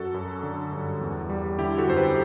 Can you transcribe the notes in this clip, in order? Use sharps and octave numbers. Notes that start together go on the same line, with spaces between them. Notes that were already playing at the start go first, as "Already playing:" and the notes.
Already playing: F#2 F#4 A4
F#2
D3
G2
E2
G3
D3 E4 G4
F#4 A4
F#2 C5
G4 B4